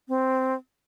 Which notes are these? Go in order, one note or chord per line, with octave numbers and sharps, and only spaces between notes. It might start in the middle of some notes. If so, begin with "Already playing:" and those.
C4